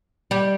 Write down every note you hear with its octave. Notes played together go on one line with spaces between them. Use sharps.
G3 G4